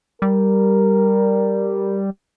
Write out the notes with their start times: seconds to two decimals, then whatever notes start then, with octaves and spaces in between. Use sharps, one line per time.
0.22 G3 A#4